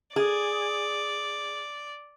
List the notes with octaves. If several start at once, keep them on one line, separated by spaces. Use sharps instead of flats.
G#4 D5